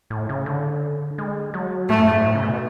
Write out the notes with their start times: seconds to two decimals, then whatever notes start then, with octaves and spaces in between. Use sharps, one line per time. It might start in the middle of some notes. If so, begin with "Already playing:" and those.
0.10 A2
0.29 C#3
0.46 D3
1.18 G#3
1.54 F#3
1.89 A2 A3
1.99 F#2
2.08 G#2
2.25 A2
2.35 C#3
2.43 B2